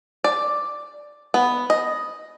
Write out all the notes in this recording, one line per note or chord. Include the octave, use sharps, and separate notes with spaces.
D5
B3
D#5